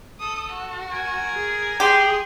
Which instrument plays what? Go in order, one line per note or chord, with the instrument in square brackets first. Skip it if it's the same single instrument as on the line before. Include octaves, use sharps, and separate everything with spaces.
[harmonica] A4 [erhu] D#6
[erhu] F#4
[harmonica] A#4 G#5
[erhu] G#4
[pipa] G4 [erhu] G#4 [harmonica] G5 C6